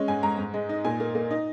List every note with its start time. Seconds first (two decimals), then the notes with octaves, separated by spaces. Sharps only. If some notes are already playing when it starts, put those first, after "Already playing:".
Already playing: G#3 C#4
0.08 G#2 G#5
0.23 G#2 A#5
0.38 G#2
0.54 G#3
0.69 D#4
0.85 A#2 G#5
1.00 A#3
1.15 A#3
1.31 D#4